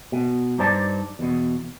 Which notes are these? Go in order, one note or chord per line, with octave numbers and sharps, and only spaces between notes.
B2
G2 D#4 C5 D5 A5
E2 B2